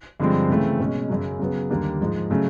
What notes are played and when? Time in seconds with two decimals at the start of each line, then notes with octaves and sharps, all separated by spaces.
0.20 G2 D3 F3 G#3 C4
0.50 C#3 E3 A3 C4
0.79 B2 G#3 C#4
1.09 F#2 C#3 F#3
1.39 C#3 F#3 B3
1.70 D#2 D3 G3 A#3 D4
2.01 G#2 F3 G#3
2.30 C#3 F#3 A3 C#4